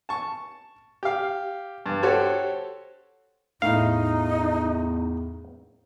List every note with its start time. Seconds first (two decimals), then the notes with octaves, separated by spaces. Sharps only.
0.09 A5 C#6
1.03 G4 F5
1.86 G2
2.03 F#4 G4 A4 C5 C#5
3.62 E2 A2 D#4 F5